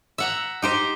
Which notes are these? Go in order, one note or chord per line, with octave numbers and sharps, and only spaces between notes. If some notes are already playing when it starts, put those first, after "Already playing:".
E5 F#5 A#5
D#4 G4 C5